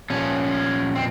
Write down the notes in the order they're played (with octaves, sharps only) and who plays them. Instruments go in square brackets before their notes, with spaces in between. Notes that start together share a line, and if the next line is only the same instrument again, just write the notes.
[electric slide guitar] A#2 F3 C#4
C4